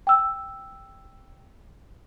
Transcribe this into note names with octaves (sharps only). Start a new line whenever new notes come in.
G5 E6